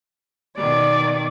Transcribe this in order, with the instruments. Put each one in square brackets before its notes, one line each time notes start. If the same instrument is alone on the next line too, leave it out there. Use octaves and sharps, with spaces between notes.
[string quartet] B2 D#3 [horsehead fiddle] D5